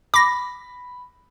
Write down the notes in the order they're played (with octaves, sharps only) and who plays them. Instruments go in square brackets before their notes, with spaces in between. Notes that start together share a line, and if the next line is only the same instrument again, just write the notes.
[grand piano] B5 [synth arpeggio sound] D6 A#6